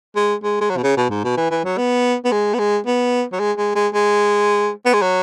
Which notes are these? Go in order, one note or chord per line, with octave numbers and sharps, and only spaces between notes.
G#3
G#3
G#3
F#3
B2
C#3
B2
G#2
B2
E3
E3
F#3
B3
B3
G#3
B3
G#3
B3
F#3
G#3
G#3
G#3
G#3
B3
G#3
F#3